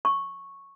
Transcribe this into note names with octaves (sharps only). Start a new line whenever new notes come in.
C#6